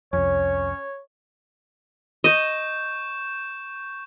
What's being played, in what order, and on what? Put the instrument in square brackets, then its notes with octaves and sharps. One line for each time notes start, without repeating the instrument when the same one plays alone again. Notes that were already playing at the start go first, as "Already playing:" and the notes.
[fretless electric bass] C2 F2 [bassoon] C#4 [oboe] C#5
[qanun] D#5 [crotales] C#6 G6 E7